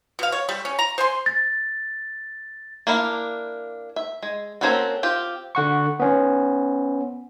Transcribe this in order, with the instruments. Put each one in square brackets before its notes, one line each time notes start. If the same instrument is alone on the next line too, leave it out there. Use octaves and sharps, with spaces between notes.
[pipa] B2 F5
C#5
G3 A3
C#4
A#5
C5 G#5 C6
[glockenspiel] A6
[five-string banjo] A#3 D4 E4 F5
E5
G#3
A#3 C4 C#4 F#4 A4
C4 F4 G4
[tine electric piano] D3 F#5 C#6
B3 C#4